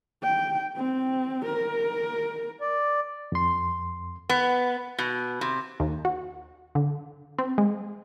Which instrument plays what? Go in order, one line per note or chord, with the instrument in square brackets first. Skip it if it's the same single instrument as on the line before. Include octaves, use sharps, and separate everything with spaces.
[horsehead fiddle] G5
C4
A#4
[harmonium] D5
[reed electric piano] F2 C6
[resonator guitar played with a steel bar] B3
B2
C3
[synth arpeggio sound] D#2
F#4
D3
C4
G#3